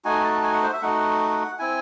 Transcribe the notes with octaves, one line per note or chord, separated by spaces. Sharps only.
A3 D#4 F#4 G#5
A5
G#5
F#5
C5
E5
A3 D#4 F#4 F#5
C4 E4 G#5